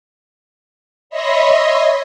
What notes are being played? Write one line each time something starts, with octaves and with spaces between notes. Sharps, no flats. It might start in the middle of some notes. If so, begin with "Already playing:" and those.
C#5 D#5 E5 B5 C6 A#6